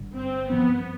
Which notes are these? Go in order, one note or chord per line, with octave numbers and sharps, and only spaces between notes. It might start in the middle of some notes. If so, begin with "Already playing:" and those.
Already playing: G1 G2 D3
C4
G2 F3 B3 C4